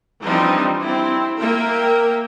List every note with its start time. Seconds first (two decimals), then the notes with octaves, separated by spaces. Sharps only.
0.24 E3 F3 G3 C4 D4 D#4
0.82 C4 E4
1.39 A#3 A#4 E5 G5